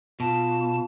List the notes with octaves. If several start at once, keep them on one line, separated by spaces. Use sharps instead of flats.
B2 F4 A5